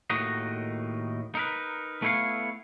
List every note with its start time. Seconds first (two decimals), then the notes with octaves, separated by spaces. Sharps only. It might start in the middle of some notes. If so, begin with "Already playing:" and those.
0.10 D#2 A2 D#3 D#4 F#4 D#5
1.35 D#4 A#4 B4
2.02 A3 B3 E4 C5 C#5 F5